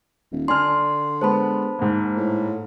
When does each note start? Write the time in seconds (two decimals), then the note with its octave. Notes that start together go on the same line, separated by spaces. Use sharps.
0.32 D#1
0.48 D3 D4 G#5 C6 F6
1.21 G#3 B3 C5 A5 B5
1.79 G#2 A#3
2.17 A2